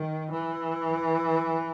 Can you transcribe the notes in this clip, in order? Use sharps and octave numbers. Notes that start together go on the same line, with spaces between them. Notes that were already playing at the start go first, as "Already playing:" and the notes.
Already playing: D#3
E3